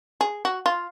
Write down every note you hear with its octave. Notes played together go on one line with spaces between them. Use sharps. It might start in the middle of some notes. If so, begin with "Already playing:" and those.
G#4
F#4
F4